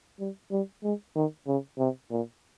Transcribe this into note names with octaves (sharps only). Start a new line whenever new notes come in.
G3
G3
G#3
D#3
C#3
C3
A#2